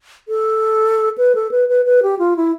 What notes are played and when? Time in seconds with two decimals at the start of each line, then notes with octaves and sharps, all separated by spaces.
0.28 A4
1.18 B4
1.35 A4
1.51 B4
1.69 B4
1.85 B4
2.03 G4
2.19 F4
2.37 E4